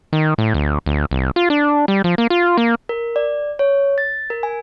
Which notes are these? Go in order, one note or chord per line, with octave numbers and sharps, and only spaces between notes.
D#3
A2
D2
D2
C2
F4
D4
G3
F3
A#3
F4
A#3
A#4
D5
C#5
A6
A#4
G#5